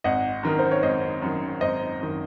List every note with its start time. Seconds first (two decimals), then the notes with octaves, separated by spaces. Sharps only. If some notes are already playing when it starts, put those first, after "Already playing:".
0.04 G#1 D#5 F#5
0.43 F#2 D#3 A#4
0.59 C5
0.71 C#5
0.83 G#1 C5 D#5
1.22 F#2 D#3
1.61 G#1 C5 D#5
2.01 F#2 D#3